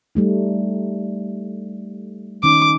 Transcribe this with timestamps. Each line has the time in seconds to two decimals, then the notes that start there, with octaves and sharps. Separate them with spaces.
0.15 G3 A3 D#4
2.44 D#3 C#4 D#4 D6